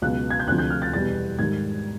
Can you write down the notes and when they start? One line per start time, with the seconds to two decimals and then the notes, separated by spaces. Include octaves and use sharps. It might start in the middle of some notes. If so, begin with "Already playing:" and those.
0.02 C#2 B2 F#3 F#6
0.30 G#6
0.40 G6
0.48 D2 C3 F3 F#6
0.58 G6
0.70 F6
0.82 A6
0.93 E2 B2 G3 A6
1.39 G#2 D#3 G3 G#6